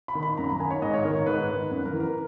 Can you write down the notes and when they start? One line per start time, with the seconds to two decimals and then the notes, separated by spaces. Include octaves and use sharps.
0.08 B5
0.15 D#3
0.23 B5
0.38 F#2 A#5
0.44 B5
0.49 A#5
0.60 D#3 G#5
0.70 C#5
0.82 G#2 D#5
0.94 C#5
1.04 D#3 A#4
1.16 C#5
1.26 G#2 B4
1.49 D#3
1.70 F#2 B4
1.85 A#4
1.93 E3
2.00 A#4